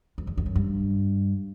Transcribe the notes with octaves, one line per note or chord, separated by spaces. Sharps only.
F2
E2
F2
F#2
G2